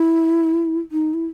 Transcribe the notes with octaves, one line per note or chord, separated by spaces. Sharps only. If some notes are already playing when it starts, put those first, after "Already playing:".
Already playing: E4
D#4
E4